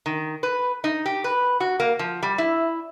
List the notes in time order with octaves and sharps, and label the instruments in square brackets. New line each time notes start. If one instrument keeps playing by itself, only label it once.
[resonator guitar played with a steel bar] D#3
B4
D#4
G4
B4
F#4
A#3
F3
G3
E4